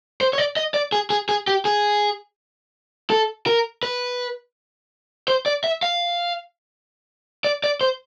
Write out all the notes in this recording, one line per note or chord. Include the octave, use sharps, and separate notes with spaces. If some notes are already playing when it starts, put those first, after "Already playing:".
C5
C#5
D5
D#5
D5
G#4
G#4
G#4
G4
G#4
A4
A#4
B4
C5
D5
E5
F5
D5
D5
C5